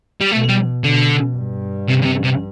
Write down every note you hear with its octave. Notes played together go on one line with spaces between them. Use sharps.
G3
B2 A3
G3
B2 D3
G2
C3
D3
C3
C3